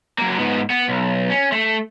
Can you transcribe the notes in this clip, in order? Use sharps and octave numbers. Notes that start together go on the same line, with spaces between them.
F#3 A#3
G#2 B3
B3
B1
C#4
A3